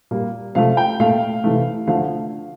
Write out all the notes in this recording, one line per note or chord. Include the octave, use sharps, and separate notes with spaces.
A#2 G3 A#3
C3 F3 A3 F5
G5
A#2 A3 F5
C3 E3 A3
D3 F3 A3 F5